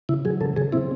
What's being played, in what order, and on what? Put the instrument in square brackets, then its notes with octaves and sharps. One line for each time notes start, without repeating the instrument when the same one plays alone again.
[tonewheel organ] C#3 E4
F#3 G#4
C#3 A4
C#3 G#4
C4 E4